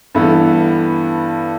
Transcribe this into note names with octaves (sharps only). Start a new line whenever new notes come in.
G2 E3 B3 E4 A4